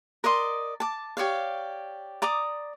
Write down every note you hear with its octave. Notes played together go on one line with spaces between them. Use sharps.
A#4 D5 D#5 C6
A5 D6
G4 C#5 D5 F5
D5 A#5 D6 D#6